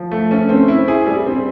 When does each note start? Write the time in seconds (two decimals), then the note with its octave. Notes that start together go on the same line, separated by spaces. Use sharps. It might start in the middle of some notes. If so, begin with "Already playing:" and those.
Already playing: F3
0.11 A3
0.31 C#4
0.49 C4
0.68 E4
0.88 G#4
1.06 G3
1.26 C4